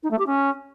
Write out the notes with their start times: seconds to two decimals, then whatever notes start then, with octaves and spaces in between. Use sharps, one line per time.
0.03 D#4
0.11 A3
0.18 G4
0.26 C#4